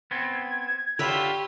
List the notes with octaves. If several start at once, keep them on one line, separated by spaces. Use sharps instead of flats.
B3 C4 G#6
D3 F4 G4 C#5 E5 B5